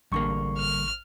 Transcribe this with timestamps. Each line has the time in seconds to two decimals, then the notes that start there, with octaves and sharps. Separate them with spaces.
0.12 A1 G2 D3 A#3 C#6
0.58 F6